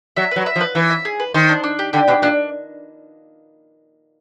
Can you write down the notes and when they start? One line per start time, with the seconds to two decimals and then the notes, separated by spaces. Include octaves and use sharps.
0.16 F#3 E5
0.31 F#3 B4
0.46 E5
0.56 F3
0.61 B4
0.75 E3 E5
0.90 E5
1.05 G#4
1.20 B4
1.34 D#3 C5
1.49 D4
1.64 D4
1.79 G4
1.93 D3 G4
2.08 B2 D4
2.22 A#2 D4